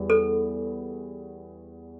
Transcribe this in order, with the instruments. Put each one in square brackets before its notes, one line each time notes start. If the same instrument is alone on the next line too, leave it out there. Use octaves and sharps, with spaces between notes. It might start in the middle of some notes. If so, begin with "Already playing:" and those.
Already playing: [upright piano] E2 G3
[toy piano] A4